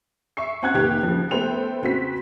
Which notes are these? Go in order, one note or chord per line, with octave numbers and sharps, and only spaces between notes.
E5 C#6 C7
C4 C#4 F#5 F#6 G#6
F1 D#3 A#3 G4 G#6
C#3 F3
A3 B3 B4 C5 G5 F7
C#3 C4 F#4 B6